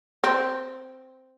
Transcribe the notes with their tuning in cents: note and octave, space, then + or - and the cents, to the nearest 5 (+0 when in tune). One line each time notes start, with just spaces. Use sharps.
C4 -5